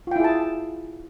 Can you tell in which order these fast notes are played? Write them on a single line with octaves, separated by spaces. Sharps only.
F4 G5 E4 G#4 A5